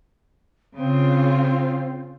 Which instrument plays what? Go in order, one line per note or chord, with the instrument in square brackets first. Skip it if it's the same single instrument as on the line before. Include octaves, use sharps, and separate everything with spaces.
[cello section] C#3 F4 [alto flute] C4